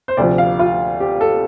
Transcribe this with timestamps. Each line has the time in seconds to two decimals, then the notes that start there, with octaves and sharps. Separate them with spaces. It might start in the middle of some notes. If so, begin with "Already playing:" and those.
0.08 C5
0.17 D2 C3 F3 D5
0.38 F5
0.59 F4
1.00 G4
1.21 A4